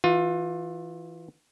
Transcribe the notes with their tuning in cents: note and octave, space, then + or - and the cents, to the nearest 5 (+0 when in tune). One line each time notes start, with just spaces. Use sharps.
E3 +0 F4 +25